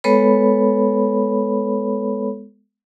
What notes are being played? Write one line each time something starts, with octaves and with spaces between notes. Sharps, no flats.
G#3 B3 A4 B4 C#5 B5